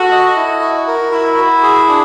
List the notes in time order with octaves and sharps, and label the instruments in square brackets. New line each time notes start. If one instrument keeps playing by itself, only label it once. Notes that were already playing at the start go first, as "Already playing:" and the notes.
Already playing: [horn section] F#4 [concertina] A4
[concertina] D#5
E4
F#4
A#4
[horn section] E4 [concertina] F#4
[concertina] F#4
G#4
D4